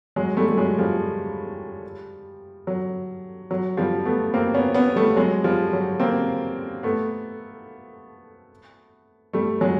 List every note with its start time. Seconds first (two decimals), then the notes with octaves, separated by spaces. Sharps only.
0.16 F#3 G#3
0.37 G3 A3
0.49 G3
0.58 F#3 G#3
0.78 F3 G3
2.67 F#3
3.51 F#3
3.77 F3 G3
4.05 A3 B3
4.34 A#3 C4
4.54 B3 C#4
4.75 B3 C#4
4.96 G3 A3
5.16 F#3 G#3
5.44 F3 G3
5.73 F#3
6.00 A#3 C4
6.83 A3 B3
9.33 G3 A3
9.61 F#3 G#3